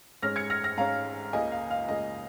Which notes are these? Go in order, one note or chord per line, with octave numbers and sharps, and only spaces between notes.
G#2 G#3 C#4 F6 A#6
G#6 C#7
F6 A#6
F6 A#6
G#2 G#3 C#4 F5 A#5
C#2 C#3 A#3 D#5 G#5
F5
F5
C#2 C#3 A#3 D#5